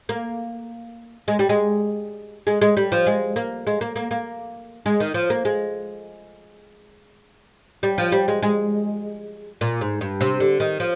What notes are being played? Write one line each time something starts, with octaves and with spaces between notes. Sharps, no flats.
A#3
G#3
G3
G#3
G#3
G#3
G3
F3
G#3
A#3
G#3
A#3
A#3
A#3
G#3
D#3
F3
A#3
G#3
G3
F3
G3
G#3
G#3
A#2
G#2
G2
C3
D3
D#3
F3